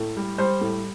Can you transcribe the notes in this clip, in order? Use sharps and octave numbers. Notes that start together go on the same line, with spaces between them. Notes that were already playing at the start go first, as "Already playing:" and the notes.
Already playing: A2
G3
G3 C5
A2